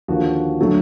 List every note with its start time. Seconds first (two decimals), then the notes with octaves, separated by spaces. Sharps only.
0.08 D#2 D3 F3 F#4
0.60 D3 F#3 A3